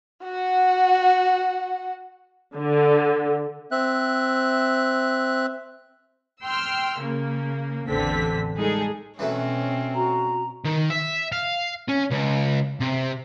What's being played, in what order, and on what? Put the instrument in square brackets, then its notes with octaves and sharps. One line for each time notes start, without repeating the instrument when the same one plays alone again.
[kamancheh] F#4 F#5
[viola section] D3
[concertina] C4 E5 F#6
[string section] G5 C6 E6 F6
C#3 A#3
A1 E2 D3 C4 B6
G3 G#3 D#4 G#4 A4
[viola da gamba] B2 C4 C#4 [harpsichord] E3 F#3 A3
[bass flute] F#4 [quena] A#5
[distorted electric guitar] D#3
E5
F5
C#4
C#2
C3